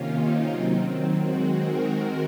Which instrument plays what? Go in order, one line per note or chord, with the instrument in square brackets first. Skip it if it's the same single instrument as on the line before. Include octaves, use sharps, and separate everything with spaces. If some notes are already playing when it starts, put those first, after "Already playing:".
Already playing: [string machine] C3 D#3 A#3 C#4 F4
D#4
D#3 F#3 C4
D#3 G#3 C4 F#4
A#4